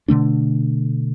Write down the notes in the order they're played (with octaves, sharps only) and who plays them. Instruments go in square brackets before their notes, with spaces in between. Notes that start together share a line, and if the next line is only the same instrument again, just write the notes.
[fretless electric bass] B2 D3 A3 D4